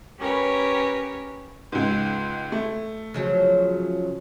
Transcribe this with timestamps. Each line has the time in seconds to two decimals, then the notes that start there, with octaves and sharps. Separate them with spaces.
0.19 C#4 G4 A#4 B4 C#5
1.72 C#2 G#2
2.52 A3
3.14 C#3 F3 F#3